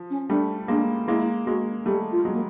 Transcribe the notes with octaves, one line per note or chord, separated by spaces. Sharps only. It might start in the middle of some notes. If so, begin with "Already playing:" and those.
Already playing: F3
C#4
G3 A3 D4
G#3 A#3 D4
G#3 A#3 E4
G#3 A#3 F#4
G3 A3 G4
F4
F#3 G#3
A#3